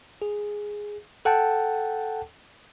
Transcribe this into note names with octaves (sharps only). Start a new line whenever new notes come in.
G#4
A4 F#5 G5 A5